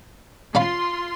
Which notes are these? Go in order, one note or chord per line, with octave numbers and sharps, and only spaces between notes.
C#4 F4 F5 B5 C6